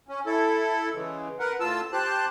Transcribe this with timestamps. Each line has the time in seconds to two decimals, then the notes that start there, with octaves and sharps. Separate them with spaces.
0.08 C#4
0.26 E4 A4
0.94 C#3 E3 G#3
1.39 A#4 B4 F#5
1.60 A2 F4 A5 E6
1.93 G4 C5 A5 F#6